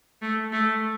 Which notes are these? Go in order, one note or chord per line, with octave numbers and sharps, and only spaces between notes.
A3
A3